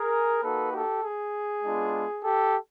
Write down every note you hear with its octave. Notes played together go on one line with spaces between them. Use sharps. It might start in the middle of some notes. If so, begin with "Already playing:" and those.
Already playing: G#4 A#4
A#3 D#4 F#4 A4 B4
G4 A4
G#4
G#3 B3 D4 F4
G4 A4